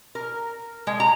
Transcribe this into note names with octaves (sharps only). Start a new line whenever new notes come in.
A#4
G#3
A#5